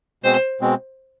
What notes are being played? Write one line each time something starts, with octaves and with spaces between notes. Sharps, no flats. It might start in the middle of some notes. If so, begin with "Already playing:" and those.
B2 G#3 C4 C5
B2 G#3 C4